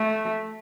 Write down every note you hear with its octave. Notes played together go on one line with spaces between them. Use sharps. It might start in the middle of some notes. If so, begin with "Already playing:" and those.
Already playing: A3